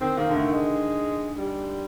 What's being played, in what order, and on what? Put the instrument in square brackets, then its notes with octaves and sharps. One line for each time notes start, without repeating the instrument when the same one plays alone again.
[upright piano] D#3 [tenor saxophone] C4
[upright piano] D#3 [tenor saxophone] A#3
[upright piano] D3
[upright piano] D#3 [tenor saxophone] A3
[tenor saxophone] G#3
G3